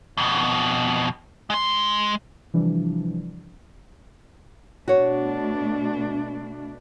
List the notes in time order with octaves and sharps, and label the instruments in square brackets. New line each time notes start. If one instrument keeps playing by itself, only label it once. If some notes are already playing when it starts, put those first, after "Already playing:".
[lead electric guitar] F2 B2
G#3 C6
[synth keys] C3 E3 F3 G3 D4
[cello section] B2 A3 D4 [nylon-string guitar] F#4 C#5